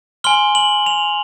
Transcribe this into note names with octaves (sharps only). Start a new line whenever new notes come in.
G#5 C6 F6 G7
F#7
F7